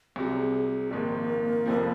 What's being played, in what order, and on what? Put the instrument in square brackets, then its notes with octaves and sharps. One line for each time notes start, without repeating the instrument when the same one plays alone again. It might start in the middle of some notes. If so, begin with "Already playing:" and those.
[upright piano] C2 C3 F#3 [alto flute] G#4
[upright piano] A#1 G#2 D#3 [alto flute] A#3
[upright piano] F1 F2 C3 F3